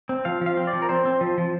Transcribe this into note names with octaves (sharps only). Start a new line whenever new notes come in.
C4
F3 F5
F3 F5
C4
D5
F3
A#4
C4 C5
C4
F3
F3